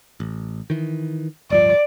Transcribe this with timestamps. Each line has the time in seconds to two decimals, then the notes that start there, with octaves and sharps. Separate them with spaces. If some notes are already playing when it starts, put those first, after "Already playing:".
0.20 A1
0.70 D#3 E3
1.50 D1 G2 F3 D5